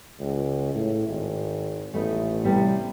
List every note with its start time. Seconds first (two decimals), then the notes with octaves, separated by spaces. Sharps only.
0.20 C#2
0.75 A2
1.08 G#1
1.94 A1 A3 B3 D#4
2.44 C3 G3 B3